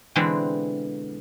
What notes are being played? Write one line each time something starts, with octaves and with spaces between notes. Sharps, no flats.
B2 D3 E3 G#3 C4